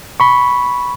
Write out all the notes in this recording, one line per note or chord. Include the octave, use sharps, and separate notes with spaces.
B5 C#6